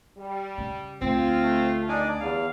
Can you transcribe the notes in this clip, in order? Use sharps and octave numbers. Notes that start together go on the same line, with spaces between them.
G3
C#3
D2 C4 F4
A3
G2 D#3 D4 D#4 D5 G#5
E2 G3 B3 F5